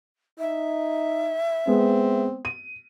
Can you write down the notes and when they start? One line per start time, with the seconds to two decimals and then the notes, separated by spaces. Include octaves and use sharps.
0.39 D#4 E5
1.67 G#3 B3 C4
2.45 D#7